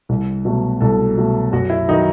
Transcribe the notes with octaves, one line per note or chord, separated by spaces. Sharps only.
C2
B2 F#3 A3
C2 A4
B2 F#3 A3
F#2 F#4
E4
D#3 F#3 D#4